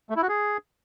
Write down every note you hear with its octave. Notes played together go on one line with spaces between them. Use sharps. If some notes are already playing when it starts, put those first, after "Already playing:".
A3
E4
F#4
G#4